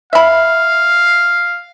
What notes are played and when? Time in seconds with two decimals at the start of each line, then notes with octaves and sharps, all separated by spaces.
0.13 E5 F5 B5